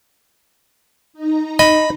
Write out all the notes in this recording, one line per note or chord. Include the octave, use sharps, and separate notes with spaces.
D#4 A#5
D#5 B5